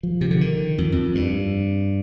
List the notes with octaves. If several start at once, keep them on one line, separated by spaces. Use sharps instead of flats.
F3
C3
D3
D#3
F2
F2
G2